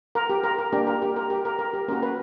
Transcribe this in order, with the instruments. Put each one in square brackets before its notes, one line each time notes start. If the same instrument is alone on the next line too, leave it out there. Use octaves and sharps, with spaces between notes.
[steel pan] A#4
G4
A#4
A#4
A#3 D4 G4
A#4
G4
A#4
G4
A#4
A#4
G4
A#3 C#4 F#4 A#4
B4